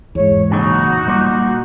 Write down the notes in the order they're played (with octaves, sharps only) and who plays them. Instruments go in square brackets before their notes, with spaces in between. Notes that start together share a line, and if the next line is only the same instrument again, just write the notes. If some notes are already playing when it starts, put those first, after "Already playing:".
[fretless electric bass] E2 G#2 [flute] C#5
[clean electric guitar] A#2 C#3 F#3 [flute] D#4 [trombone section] F#4
[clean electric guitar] A#2 [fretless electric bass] G3